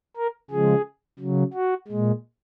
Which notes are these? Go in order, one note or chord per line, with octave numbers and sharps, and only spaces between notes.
A#4
C#3 F3 G#3 G#4
C#3 F#3
F#4
A#2 G#3